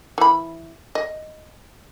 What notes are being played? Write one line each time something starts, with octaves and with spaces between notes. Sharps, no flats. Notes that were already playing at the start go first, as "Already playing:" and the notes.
E3 B5
D#5